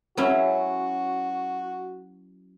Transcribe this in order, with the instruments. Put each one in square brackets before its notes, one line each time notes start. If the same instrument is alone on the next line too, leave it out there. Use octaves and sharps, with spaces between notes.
[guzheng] F#3 C#4 E4 [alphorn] F#4